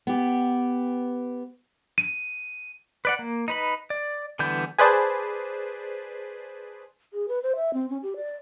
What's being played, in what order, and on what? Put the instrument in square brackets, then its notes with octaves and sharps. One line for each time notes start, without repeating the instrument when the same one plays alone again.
[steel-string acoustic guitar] B3 G4
[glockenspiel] D#7
[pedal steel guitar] B4 D5 F#5
A#3
D#4 B4 B5
D5
D3 E3 G3 B3 G6
[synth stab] G#4 B4 C5 D5 A5
[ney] G#4
B4
C5
E5
C4
C#4
G4
D5